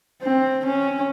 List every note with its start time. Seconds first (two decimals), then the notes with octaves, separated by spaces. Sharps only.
0.22 C4
0.65 C#4